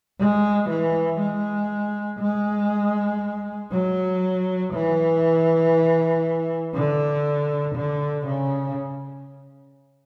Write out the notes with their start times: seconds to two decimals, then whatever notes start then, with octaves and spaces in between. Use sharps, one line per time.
0.19 G#3
0.70 E3
1.20 G#3
2.20 G#3
3.72 F#3
4.73 E3
6.74 D3
7.76 D3
8.27 C#3